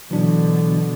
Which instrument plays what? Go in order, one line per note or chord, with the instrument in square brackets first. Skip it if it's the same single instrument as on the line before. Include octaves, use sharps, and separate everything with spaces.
[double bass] B2 D3 [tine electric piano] E3 F#3 D4